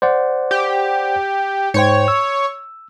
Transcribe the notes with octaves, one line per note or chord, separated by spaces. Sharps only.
C5 D5 F#5
G4
G#2 C5 C#5 G5
E6